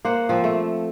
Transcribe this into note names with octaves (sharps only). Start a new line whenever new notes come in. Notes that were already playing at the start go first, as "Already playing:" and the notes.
A#3 C5 F#5
F3 C4
A3